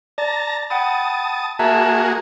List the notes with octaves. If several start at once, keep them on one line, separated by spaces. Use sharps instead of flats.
D5 A5 A#5
F#5 G5 A5 B5 D#6
A#3 F#4 G#4 E5 A5 A#5